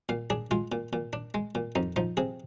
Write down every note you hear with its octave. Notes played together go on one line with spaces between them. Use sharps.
A#2 F5
D4 G#4
G#3 F4
A#2
A#2
D4
G#3
A#2
F2 D#4
F3 D#4
C3 G#4